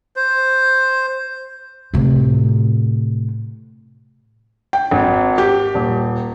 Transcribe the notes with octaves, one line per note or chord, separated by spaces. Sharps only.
C5
A2 C3
G5
G#1
G4
D#1